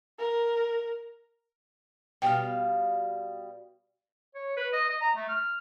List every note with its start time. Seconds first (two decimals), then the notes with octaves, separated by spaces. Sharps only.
0.18 A#4
2.22 B2 G3 F5 G5
4.35 C#5
4.57 B4
4.73 D#5
4.89 D#5
5.01 A#5
5.16 A3
5.29 F6